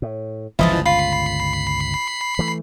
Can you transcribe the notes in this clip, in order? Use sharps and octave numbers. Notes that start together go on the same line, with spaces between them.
A2
G1 C#2 E3 F3 E4 D#5 A5
F4 B5 C7
E3 A3